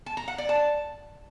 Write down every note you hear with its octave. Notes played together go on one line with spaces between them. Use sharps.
A5
A#5
F#5
D5
A5